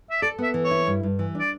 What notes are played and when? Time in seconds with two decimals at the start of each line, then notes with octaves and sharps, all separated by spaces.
0.11 E5
0.22 A4 D5
0.38 B3 E5
0.54 E3
0.65 C#5
0.71 E4
0.87 G2
1.03 G2
1.19 E3
1.35 D4 D5